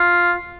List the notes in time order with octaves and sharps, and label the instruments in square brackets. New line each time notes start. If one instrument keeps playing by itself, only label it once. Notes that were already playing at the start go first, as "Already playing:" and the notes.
Already playing: [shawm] F4